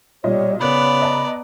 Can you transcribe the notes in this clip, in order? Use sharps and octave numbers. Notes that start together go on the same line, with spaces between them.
B1 A#2 G3 C#5 D#5
C#3 B3 A#4 D5 B5 F#6
D#5 A5 A#5